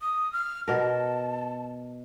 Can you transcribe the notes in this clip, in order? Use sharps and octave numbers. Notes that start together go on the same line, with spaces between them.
D#6
F6
B2 A#4 A5